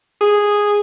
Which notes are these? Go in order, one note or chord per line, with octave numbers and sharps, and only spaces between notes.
G#4